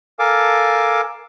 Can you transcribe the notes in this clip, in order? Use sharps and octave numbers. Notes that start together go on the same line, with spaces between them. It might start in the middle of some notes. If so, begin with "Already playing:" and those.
A4 A#4 F5 G#5 A5 D6